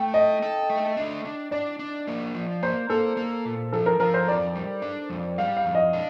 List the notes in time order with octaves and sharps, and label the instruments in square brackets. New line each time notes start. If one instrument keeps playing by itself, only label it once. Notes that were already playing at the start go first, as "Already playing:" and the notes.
Already playing: [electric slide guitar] A3 [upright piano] G5
[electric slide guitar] A4 [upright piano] D#5
[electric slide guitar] A4
A3
D4
D4
[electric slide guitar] D4 [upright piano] D5
[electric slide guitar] D4
A#3
F3
[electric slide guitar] A#3 [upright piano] C5
[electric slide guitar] A#3 [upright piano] A4
[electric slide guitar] A#3
A#2
[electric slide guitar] F3 [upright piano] A4
[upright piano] A#4
[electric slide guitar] F3 [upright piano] A#4
[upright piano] C5
[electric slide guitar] F2 [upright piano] D5
[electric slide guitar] G3
D4
F2
[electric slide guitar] G3 [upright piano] F5
[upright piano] F5
[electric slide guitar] F2
[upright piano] D#5
[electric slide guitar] D4